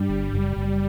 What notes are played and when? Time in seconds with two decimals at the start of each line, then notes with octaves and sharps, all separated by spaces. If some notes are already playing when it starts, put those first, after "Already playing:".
Already playing: G2 G3
0.09 G1
0.33 F#1
0.56 F#1